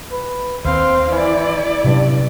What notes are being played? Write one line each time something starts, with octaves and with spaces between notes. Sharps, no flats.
B4
D#2 C4 C5 F5
E3 E4 D5
G2 C3 F#3 C#4